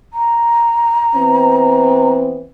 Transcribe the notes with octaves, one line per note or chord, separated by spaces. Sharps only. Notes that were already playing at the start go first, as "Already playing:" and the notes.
A#5
E3 B3 C4